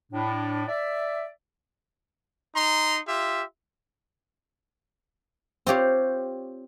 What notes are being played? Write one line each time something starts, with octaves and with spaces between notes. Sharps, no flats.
A2 D4
D5 E5
D#4 A#5 C6
F4 G4 E5
C4 F4 G4 C#5